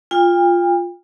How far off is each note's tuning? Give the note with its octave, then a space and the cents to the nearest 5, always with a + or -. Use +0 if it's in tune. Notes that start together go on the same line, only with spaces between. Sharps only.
F4 +0 G5 +40